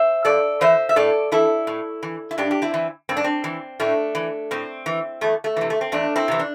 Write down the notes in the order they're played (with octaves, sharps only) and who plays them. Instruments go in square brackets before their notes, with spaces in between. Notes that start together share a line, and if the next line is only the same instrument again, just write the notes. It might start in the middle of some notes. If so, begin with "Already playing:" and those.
Already playing: [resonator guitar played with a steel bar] C5 E5
G2 A4 D5
E3 C5 E5
E5
A2 A4 D5
E3 E4 A4
A2
E3
E4
G2 D4 G4
G4
C4 E4
E3
G2 C4
D4
C4
E3
A2 A3 D4
E3
A2 C4
E3
E2 A3
A3
C3 E3
A3
C4
E2 A3 D4
C4 E4
C3 E3
D4